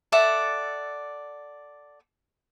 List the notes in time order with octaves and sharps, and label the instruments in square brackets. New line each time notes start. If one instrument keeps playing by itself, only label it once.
[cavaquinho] A4 D5 E5 F#5